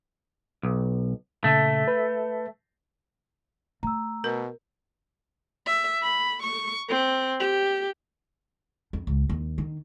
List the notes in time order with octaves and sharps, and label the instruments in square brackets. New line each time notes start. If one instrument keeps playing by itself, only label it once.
[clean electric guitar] B1
[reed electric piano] A#2 C#3 [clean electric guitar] A3
[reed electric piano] B4
[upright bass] A3 [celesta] A#5 E6
[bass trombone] B2 [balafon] A#4
[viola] E5
B5
C#6
C4
G4
[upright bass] F2
C#2
D#2
D#3